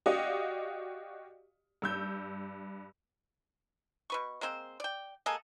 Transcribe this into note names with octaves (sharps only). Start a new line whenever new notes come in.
F#4 G4 D5 D#5 F5
G2 E6 G6
B2 B4 C#6
G#3 A#3 C4 C5
D5 G5
G#3 A#3 G#4 A4